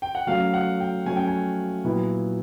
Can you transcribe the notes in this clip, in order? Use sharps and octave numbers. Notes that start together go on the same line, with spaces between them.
G5
F#5
F#3 A3 C#4 F5
F#5
G5
F#3 A3 C#4 G#5
G5
G#5
A#2 F#3 B3 E4